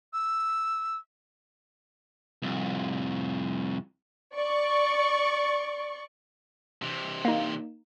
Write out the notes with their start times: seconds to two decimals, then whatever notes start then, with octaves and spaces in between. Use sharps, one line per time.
0.13 E6
2.42 C2 F2
4.35 D5 C#6
6.82 C3 E3
7.25 A#3 D#4